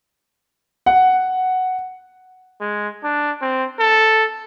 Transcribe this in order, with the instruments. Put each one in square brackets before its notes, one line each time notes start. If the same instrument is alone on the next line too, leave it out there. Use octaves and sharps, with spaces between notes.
[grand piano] F#5
[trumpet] G#3
D4
C4
A4